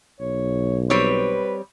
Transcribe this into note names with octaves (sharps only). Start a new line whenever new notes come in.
B1 C#5
G3 C4 B4 C#5